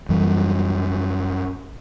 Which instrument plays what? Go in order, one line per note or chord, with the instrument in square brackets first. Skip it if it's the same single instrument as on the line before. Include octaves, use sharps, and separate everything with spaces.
[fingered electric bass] F#2 E3 G3